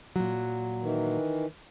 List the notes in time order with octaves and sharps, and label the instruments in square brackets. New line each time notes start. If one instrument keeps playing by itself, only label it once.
[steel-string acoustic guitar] A#2 F#3
[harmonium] D#3 E3